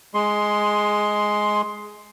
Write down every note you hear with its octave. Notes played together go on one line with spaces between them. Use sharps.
G#3 C6